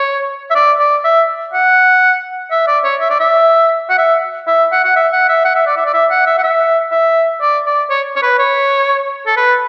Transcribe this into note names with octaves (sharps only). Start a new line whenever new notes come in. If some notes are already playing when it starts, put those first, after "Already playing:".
Already playing: C#5
E5
D5
D5
E5
F#5
E5
D5
C#5
E5
D5
E5
F#5
E5
E5
F#5
F#5
E5
F#5
E5
F#5
E5
D5
E5
D5
E5
F#5
E5
F#5
E5
E5
D5
D5
C#5
C#5
B4
C#5
A4
B4